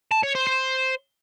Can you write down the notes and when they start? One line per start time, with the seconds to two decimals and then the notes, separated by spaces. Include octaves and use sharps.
0.12 A5
0.23 C#5
0.35 C5
0.47 C5